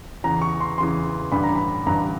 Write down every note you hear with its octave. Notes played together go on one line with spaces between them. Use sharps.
E2 C#3 E3 A#5
C#6
C6
E2 C#3 E3 C6
A1 G2 D3 B5
A#5
B5
A1 G2 D3 A#5